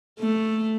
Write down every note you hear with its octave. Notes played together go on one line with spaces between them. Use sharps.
A3